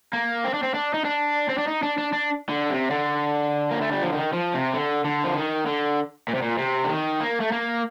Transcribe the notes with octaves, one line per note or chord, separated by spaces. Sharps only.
A#3
C4
D4
C4
D4
D#4
D4
C4
D4
D#4
D4
D4
D4
D3
C3
D3
A#3
A3
G3
F3
D#3
F3
C3
D3
D3
F3
D#3
D3
A#2
C3
A#2
C3
D3
D#3
A#3
A3
A#3